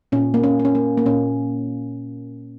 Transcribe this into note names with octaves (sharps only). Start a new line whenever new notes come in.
A#2 C#4
A#3
C#4
A#3
C#4
A#3
A#3
A#2 C#4